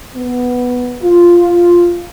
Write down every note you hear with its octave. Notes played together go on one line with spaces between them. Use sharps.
B3
F4